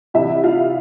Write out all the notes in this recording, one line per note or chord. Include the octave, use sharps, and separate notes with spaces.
C2 C3 E3 E4 E5
F4 F5